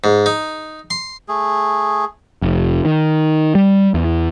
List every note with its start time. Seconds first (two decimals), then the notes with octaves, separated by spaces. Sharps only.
0.04 G#2
0.26 D#4
0.90 C6
1.28 A3 G#4
2.42 F1
2.85 D#3
3.55 G3
3.94 E2